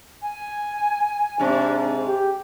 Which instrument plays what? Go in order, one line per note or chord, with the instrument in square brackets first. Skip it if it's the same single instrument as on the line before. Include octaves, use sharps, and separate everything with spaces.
[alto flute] G#5
[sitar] G#2 C3 [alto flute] D4
[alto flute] G4